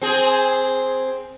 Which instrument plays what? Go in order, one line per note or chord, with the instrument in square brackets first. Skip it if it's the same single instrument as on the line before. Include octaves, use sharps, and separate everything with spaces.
[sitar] C4 G#4